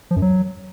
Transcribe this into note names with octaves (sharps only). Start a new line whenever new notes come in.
F3
F#2
F#3